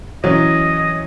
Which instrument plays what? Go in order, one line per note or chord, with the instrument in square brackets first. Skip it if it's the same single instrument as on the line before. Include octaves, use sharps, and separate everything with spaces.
[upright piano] E3 F#3 C#4 [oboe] D#5